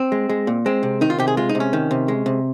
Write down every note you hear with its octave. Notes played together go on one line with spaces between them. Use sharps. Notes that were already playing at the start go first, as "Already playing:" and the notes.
Already playing: C4
G#3
G#3
A#2
G#3 C4
C3
D#3 D#4
F4
C3 G4
G#4
G#3 F4
D#4
C3
C#4
D#3
C3
G#3
C3